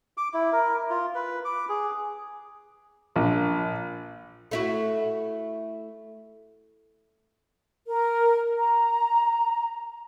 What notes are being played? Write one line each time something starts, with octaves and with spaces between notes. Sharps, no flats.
D6
E4
A#4
F4
B4
D6
G#4
A#1
A3 E4 F#4
A#4
A#5